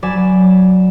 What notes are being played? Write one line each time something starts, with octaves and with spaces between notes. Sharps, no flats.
F#3 D5 G#5 B5 E7